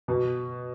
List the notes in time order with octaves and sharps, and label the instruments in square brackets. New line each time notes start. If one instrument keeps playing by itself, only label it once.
[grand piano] B2